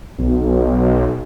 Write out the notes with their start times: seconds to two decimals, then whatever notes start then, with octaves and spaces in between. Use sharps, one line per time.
0.18 B1